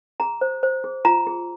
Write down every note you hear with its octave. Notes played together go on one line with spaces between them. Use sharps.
G#4 A#5
C5
C5
G#4
F4 A#5
G#4